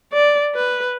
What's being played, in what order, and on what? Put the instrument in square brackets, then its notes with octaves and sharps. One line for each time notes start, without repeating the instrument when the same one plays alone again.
[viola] D5
B4